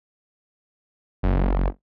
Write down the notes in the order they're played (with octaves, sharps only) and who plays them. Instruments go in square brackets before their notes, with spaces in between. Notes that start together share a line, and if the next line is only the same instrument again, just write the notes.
[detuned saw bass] F#1